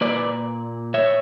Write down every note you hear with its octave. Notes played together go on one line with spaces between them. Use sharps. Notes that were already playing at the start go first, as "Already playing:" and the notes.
A#2 A#3 B4 D5
C#5 E5